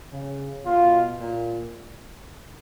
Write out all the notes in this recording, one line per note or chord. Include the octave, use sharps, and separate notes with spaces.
C#3
B2 F4
A#2